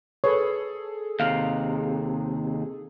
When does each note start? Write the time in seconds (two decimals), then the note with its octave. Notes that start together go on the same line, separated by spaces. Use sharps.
0.24 G#4 A4 B4 C#5
1.20 D#2 C3 F5